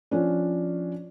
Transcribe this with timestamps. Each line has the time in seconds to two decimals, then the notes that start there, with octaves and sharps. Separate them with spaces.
0.11 F3 C#4 D4